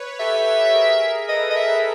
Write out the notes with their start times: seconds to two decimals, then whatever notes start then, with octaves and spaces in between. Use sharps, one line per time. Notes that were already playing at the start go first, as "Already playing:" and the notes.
Already playing: B4 C#5
0.20 G4 A4 E5
0.74 G#4 A#4
1.29 A4 B4 D#5
1.51 D#5
1.56 E5